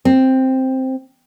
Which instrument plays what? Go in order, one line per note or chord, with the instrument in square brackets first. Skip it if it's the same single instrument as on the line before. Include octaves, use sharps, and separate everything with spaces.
[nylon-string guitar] C4